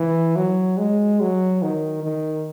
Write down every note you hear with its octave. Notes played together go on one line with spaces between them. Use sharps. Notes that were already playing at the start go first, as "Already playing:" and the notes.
Already playing: E3
F#3
G#3
F#3
D#3
D#3